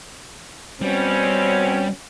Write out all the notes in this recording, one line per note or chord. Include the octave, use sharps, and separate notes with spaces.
B2 G3 C4 C#4